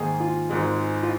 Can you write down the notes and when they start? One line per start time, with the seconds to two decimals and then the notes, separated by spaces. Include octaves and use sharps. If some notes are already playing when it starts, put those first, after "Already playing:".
Already playing: G#2 D#3 A#3 G#4
0.20 F4
0.49 G#1 G#2 G#3
1.03 F4